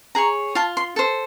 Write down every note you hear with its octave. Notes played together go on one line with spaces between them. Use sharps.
G#4 C#5 A#5
F4 A5
C6
A4 C5